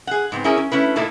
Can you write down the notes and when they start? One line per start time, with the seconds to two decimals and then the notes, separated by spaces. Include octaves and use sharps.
0.07 G#4 F#5
0.32 G#2 B3 C4
0.44 C#4 E4 G#4 A#4 C#5
0.57 C#4
0.71 A3 C#4 E4 B4
0.96 A#2 A3 A#3 D#4 E4 A5